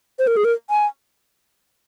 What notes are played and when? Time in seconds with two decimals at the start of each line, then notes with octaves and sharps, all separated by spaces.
0.19 C5
0.27 A#4
0.37 G#4
0.45 A#4
0.70 G#5